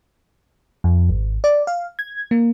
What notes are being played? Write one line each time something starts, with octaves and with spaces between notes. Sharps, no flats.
F2
G#1
D5
F5
G#6
A#3